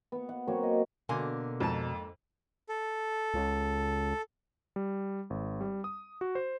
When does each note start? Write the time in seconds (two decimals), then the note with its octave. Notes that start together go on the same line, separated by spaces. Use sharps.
0.12 B3 C#6
0.29 F#5
0.48 F#3 A#3 C4 C#5
0.63 D#5
1.09 B2 D3 A#3 G#5 C6
1.60 F2 G#2 A5
2.69 A4
3.34 C#2
4.76 G3
5.30 G#1
5.61 G3
5.84 D#6
6.21 F#4
6.35 C5